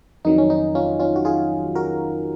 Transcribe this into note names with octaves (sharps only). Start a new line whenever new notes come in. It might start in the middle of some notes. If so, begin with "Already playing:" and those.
F2 D#3 F#3 D#4
C#4
D#4
C#4 F4
C#4 F4
F#4
F4 G#4
F#4 A#4